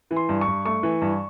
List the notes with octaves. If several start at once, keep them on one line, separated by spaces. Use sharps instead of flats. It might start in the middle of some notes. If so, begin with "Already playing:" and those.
E3
C6
G2
C#6
G2
A3 C#6
E3
G2